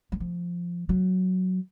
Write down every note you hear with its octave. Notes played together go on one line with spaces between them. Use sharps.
F#3
F3
F#3